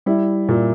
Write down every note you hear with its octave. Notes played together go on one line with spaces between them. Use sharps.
G3 E4
A#2